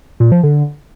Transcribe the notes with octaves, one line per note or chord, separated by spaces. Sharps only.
A#2
F3
D3